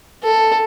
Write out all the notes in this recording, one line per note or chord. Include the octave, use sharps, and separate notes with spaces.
A4